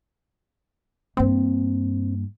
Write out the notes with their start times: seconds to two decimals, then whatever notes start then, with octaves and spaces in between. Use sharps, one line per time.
1.17 G2 A#3 C4